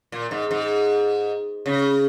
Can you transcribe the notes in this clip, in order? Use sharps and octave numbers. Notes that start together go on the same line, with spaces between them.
A#2
G#2
G#2
C#3